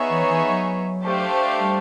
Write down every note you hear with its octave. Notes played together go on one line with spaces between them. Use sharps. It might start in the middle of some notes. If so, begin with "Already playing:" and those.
Already playing: B3 D#4 G#4 C#5 E5
E3
E3
F#3
A3 D4 G4 C5 F5
G3